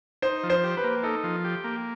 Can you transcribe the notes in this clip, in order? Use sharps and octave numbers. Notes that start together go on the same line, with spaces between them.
D#4 C5
F3
C5
G4
B4
A#3
D#4 A4
F3
G4
A#3